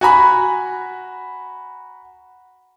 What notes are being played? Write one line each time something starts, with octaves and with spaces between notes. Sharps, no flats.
F#4 G#5 A#5 B5